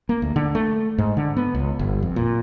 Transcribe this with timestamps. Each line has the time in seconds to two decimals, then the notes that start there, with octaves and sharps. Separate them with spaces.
0.09 A#3
0.22 D2
0.36 D3
0.55 A3
0.98 G#2
1.17 D3
1.37 B3
1.55 C#2
1.79 G1
2.02 F2
2.16 A#2